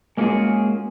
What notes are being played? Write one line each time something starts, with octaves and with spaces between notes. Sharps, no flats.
G#3 A#3 C#4 F4 F#4 G#4